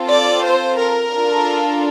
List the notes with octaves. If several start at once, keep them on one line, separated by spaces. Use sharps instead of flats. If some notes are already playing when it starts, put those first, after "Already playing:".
Already playing: C4 F4 A4
D5
C5
A#4
D4 F4 A4